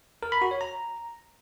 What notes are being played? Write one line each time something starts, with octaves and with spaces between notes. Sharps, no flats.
A#4
B5
F#4
C#5
A#5